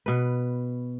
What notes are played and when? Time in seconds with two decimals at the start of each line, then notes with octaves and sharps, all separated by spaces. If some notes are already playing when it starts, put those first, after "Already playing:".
0.06 B2 B4